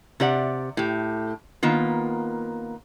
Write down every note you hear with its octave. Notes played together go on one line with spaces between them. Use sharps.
C3 G4 D5 F#5
A2 G4
D#3 A#3 B3 F4